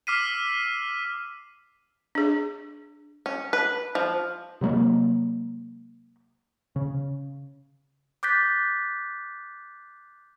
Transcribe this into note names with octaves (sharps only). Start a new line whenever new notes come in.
D6 E6 F6 B6 C7 D#7
D4 G#4
C#4
B4
F3
C3 F#3 G#3 A#3
C#3
D6 F#6 G6 A6 B6